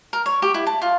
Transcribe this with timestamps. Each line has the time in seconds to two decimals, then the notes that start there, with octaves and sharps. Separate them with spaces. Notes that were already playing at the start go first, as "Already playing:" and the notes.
0.13 A#4
0.26 C#5
0.42 G4
0.54 E4
0.67 A5
0.82 F4